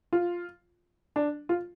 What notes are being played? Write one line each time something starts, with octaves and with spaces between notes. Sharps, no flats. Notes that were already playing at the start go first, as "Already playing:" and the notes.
F4
D4
F4